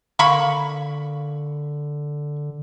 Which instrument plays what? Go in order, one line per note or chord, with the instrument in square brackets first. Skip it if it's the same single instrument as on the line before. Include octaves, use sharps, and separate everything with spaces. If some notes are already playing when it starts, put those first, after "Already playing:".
[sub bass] D3 [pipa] A#3 B5 C#6